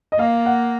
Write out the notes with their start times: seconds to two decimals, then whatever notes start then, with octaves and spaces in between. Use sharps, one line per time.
0.12 D#5
0.19 A#3 F5
0.46 F#5